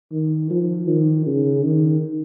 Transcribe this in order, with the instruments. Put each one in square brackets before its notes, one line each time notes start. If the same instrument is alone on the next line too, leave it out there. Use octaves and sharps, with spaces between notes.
[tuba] D#3
F3
D#3
C#3
D#3